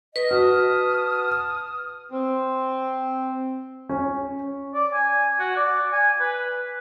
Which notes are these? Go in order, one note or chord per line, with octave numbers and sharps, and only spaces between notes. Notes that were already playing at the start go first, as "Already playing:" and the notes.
B4 D#5
F#4 A5 D#6 F6
C4
C#4
D5
G#5
F#4
D5
G#5
B4